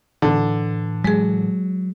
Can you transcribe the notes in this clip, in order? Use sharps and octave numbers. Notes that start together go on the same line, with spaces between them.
A2 D3 E3
F#3 G#3 G#4